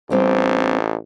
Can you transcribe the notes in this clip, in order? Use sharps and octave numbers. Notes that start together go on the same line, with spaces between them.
A1 G3 C4 D4